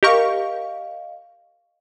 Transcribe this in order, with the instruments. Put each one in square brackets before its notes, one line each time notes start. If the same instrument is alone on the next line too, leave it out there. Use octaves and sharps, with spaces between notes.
[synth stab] G4 A#4 C#6 [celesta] D#5 F5